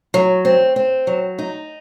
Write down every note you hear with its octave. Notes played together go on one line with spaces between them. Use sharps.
F#3
C4
C4
F#3
D#4